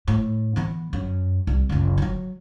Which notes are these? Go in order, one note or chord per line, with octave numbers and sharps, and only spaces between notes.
A2
E3 B3
F#2
C2
F#1 C#2
D#3 F#3